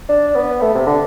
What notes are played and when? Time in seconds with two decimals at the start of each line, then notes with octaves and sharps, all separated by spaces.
0.09 D4
0.36 B3
0.61 A3
0.74 C3
0.87 D3